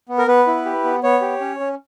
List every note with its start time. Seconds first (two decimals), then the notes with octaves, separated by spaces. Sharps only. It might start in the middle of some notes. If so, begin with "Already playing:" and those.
0.09 B3
0.18 A#4
0.27 B3 B4
0.47 E4
0.65 G4
0.84 B3
1.03 B3 C#5
1.22 G4
1.41 C#4
1.60 C#4